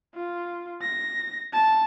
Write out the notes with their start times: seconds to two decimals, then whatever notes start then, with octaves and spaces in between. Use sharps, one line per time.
0.15 F4
0.82 A#6
1.53 A5